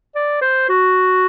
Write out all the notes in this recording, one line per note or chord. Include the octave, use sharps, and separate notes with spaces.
D5
C5
F#4